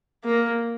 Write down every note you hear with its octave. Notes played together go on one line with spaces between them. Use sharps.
A#3